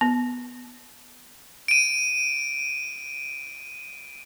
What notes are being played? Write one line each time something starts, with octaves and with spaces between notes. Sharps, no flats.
B3
D7 D#7